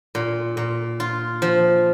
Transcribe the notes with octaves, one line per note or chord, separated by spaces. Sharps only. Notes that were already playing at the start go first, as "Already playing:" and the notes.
A#2
A#2
F4
F3